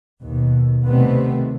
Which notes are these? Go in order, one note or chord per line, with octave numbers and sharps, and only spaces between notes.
D#2 B2
C3 D#3 G3 A3 B3 C4